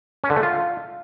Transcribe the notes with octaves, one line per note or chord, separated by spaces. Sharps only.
C#4
D3
A3
F4